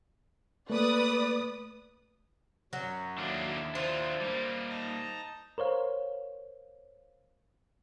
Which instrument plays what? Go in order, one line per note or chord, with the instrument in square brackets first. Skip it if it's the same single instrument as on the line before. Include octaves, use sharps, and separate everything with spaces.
[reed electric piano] A3 A#3 [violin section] B4 D5 D#6
[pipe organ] F#2 C#4 [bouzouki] F#3
[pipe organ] D#2 E4 [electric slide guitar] D3 A#3 D4
[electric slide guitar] D4 F4 [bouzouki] C5
[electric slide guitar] G3 A#3
[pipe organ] D#4 A5 A#5
[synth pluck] A#4 C5 C#5 F5